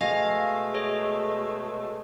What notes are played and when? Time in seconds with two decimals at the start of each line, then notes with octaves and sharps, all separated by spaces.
0.01 B2 G#3 A3 D#5 F5 G#5 A#6
0.74 G#4 C#5 D#5